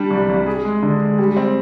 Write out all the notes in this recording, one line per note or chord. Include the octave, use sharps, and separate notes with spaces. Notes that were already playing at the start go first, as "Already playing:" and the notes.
Already playing: G3 D4
C2
C2
G#4
G#3
D3
G#3
G3
C4